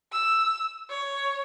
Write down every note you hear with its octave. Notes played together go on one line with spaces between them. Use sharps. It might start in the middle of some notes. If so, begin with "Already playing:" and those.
E6
C#5